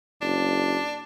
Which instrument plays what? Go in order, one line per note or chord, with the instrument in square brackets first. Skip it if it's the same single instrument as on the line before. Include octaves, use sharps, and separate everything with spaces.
[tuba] F#1 [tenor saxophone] D4